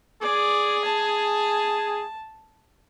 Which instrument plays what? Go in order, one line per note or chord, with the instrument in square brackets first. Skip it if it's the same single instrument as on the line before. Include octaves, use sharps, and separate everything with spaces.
[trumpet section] G#4 [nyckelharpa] D5
[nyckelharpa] A5